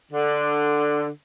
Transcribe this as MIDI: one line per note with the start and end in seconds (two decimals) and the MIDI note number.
0.12 1.08 50